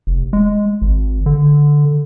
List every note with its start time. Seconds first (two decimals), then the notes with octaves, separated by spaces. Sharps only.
0.07 F1
0.33 G#3
0.82 G#1
1.26 D3